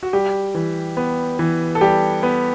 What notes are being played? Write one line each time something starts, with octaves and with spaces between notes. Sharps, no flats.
F#4
G3 G4
E3
B3
E3
A4
G3 G4
B3